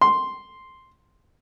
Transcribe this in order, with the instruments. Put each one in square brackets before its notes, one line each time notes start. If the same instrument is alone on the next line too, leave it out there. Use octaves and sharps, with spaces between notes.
[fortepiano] C6